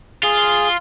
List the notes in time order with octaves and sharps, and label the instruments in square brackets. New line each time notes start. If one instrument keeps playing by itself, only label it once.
[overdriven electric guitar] F4 [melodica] G#4